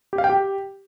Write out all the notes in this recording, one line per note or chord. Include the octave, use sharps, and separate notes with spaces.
G4
F5
G5
G4